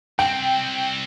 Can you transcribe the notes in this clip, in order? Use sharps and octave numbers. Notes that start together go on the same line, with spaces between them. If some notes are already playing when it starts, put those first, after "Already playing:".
C2 C4 G5